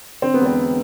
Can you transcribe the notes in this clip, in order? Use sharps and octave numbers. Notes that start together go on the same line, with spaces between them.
D3 C4
B3
E1
C4